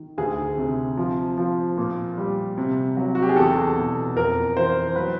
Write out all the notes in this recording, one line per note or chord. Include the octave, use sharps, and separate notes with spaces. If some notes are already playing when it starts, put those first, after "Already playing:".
Already playing: D#3
D2 G#4
C3
F3
F3
A#2
G3
C3
F#3
F#4
G4
G#4
E2 A4
B2
F2 A#4
E3 C5
F#3 B4